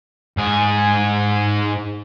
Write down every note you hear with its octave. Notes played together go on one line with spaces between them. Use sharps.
G#2 G#4